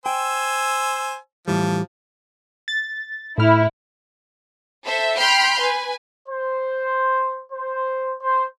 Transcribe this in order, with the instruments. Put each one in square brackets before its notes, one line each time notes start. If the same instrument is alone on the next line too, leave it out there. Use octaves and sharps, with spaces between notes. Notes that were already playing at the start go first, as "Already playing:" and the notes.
[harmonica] C5 G#5 E6 [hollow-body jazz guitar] G5
[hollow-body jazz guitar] A2 E3 G3 [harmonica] F3
[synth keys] A6
[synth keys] A2 F6 [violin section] E4
[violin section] A4 C5 E5
G5 B5 C6 F6 G6
B4 G#5
[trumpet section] C5
C5
C5